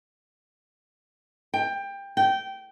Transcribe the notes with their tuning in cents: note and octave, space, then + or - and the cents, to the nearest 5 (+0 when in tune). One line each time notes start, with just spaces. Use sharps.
G5 +20
G5 -15